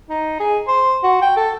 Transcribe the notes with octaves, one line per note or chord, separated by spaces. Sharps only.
D#4
G#4
C5
F#4
G5
A4